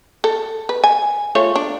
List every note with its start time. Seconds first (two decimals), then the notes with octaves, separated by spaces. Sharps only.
0.24 A4
0.69 B4
0.84 G#5
1.35 A3 F4 C#5
1.56 D4